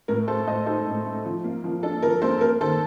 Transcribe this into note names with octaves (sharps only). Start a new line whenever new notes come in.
A2 A#4
A3 A4 C5
A2 C5 D#5
D#4 A4 C5
A2
A3
F3
A#3
F3
D4 A4
F3 A#4
A#3 A4 C5
A#3 A#4
D#3 A4 C5